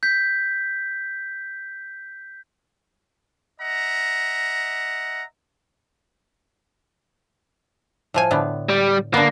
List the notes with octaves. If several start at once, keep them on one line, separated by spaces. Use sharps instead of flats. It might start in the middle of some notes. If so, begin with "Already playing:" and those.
G6 B6
D#5 E5 F#5 A#5
A2 F3 G#5
A2 D3 B3
G3
D3 A#3 B3